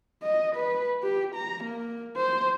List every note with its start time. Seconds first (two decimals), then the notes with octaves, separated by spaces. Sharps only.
0.23 D#5
0.55 B4
1.03 G4
1.35 A#5
1.64 A#3
2.17 C5